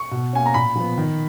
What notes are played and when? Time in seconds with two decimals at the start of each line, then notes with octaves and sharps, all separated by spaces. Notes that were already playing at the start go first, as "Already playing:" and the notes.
Already playing: C#6
0.11 B2
0.33 A#3 C#4 G#5
0.46 A#5
0.54 A#2 B5
0.75 F3 B3
0.97 D#3